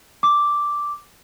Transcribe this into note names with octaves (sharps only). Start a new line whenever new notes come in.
D6